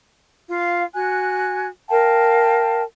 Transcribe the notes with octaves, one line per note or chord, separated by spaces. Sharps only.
F4 F5
F#4 G#5 F#6
A#4 F5 G5 A5